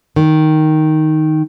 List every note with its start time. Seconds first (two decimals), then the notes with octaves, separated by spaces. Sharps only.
0.16 D#3